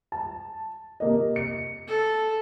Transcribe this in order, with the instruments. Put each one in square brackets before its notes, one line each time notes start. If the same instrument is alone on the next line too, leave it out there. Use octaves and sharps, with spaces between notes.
[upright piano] A5
C3 A#3 D#5
C#7
[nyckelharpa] A4